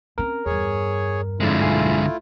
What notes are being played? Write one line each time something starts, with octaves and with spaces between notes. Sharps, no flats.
C4 C#4 A#4
E2 G2 G#4 C#5
F2 G#2 D3 G#3 A3 E4 F4
B1 G#5 C7